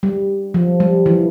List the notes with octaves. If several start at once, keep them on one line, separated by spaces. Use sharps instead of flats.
G3
F3
G3
E3